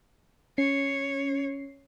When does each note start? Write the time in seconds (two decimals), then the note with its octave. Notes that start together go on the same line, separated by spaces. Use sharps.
0.58 C#4 C#5 C7